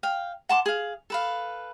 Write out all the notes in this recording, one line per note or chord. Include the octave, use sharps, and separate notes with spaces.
F5 G5
F#5 A5 C6 D6
G#4 F5
A4 B4 F5